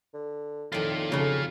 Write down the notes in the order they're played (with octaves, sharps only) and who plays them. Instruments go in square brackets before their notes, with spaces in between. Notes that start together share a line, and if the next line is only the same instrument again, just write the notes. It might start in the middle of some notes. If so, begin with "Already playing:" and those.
[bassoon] D3
[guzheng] F2 D#3 [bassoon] A2 [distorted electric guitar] F4 D5
[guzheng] F2 F#3 [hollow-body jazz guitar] C#3